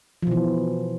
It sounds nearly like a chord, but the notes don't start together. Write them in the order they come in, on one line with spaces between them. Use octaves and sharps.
F3 B2 E3